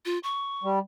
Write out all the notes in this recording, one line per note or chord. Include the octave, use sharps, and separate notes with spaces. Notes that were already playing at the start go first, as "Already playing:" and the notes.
F4
C#6
G3